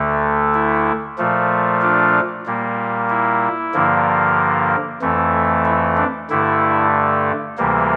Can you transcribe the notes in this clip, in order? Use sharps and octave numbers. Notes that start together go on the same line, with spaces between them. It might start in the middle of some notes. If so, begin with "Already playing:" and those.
Already playing: D2 D3 A3
E4
A#2 F3 A3
D4 F4
A#2 G3 A#3
E4
G2 D3 F3 A#3
F2 E3 A3
E4
D4
G2 D3 A3 E4
D2 C3 E3 G3 A#3